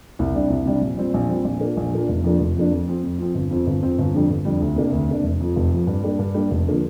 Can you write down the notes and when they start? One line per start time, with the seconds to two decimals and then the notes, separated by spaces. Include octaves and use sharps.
0.19 C2
0.34 C3 G3 D4
0.50 C2
0.65 C3 G3 D4
0.82 A#1
0.97 A#2 G3 C4
1.14 A#1
1.29 A#2 G3 C4
1.45 A#1
1.60 A#2 A#3 D4
1.77 A#1
1.93 A#2 A#3 D4
2.09 F1
2.23 F2 F3 A#3 D4
2.40 F1
2.56 F2 F3 A#3 D4
2.71 F2
2.88 F3 C4
3.03 F2
3.18 F3 C4
3.35 G1
3.51 F2 F3 C4
3.67 G1
3.83 F2 F3 C4
3.98 G1
4.14 F2 D3 G3 D4
4.30 G1
4.45 F2 D3 G3 D4
4.61 D2
4.76 C3 A#3 D4
4.92 D2
5.08 C3 A#3 D4
5.24 F1
5.40 F2 F3
5.56 F1
5.72 F2 F3
5.87 G2
6.03 G3 A#3 D4
6.19 G2
6.34 G3 A#3 D4
6.51 F1
6.68 D3 F3 A#3